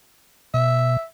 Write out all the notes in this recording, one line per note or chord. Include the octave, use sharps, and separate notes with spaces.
B2 E5